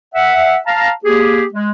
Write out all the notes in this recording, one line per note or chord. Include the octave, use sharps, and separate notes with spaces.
E5 F#5
F5 A5 A#5
A#3 G4 G#4
G#3